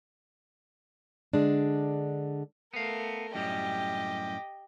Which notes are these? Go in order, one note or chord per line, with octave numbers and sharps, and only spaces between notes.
D3 G#3 D4
A3 B3 A#4 F5
F#2 A2 G3 G4 D#5